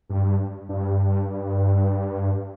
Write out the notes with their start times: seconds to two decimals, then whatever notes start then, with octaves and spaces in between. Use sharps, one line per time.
0.09 G2
0.69 G2